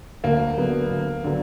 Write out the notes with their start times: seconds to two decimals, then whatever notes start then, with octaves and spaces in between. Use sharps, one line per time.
0.24 D2 A#3
0.57 D3 F#3 B3
0.91 D2
1.24 D3 F#3 B3